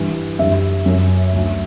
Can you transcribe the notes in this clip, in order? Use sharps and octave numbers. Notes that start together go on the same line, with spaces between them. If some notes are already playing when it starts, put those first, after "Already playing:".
Already playing: G2 E3 G3
F#2 D3 G3 E5
F#2 F#3
D2 D3 F#3